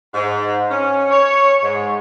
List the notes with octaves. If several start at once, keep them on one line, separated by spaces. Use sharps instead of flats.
G#2
C#4
C#5
G#2